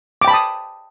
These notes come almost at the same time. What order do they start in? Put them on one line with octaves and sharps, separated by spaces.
D6 G5 B5 A5 D#6